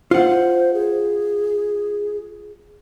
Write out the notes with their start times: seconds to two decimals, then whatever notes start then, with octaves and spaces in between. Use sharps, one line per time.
0.11 F4 C5 F#5
0.74 G#4